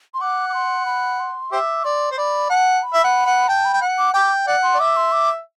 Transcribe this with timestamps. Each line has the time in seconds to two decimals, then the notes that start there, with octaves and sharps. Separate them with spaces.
0.14 C6
0.21 F#5 D6
0.49 D6
0.54 C6
0.86 B5
1.20 C6
1.52 G4 C5 E5 D6
1.84 D5 C6
2.12 C5
2.18 D5 B5
2.50 F#5 A5
2.83 B5
2.94 E5
3.04 F#5
3.26 F#5
3.48 G5 A5
3.65 B5
3.73 G5
3.81 F#5
3.98 D6
4.14 G5 D6
4.47 D5 F#5
4.63 C6
4.74 D5
4.79 E5 D6
4.97 C6
5.12 D6